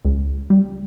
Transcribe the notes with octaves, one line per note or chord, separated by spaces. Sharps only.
C#2
G3